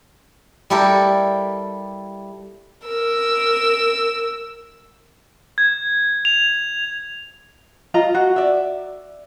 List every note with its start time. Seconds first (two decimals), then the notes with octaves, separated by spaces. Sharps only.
0.70 G3 E4 G4 A4 A#4
2.87 A#4 E6
5.58 G#6
6.25 F7
7.94 F4 D#5 A#5
8.14 F#4
8.36 D5 E5